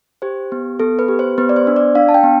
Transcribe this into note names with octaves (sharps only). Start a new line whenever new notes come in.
G4 C5
B3
B3 A4
B4
G4
C5
B3 B4
D5
C5
D4
D5
D4 F5
A5
G5
B3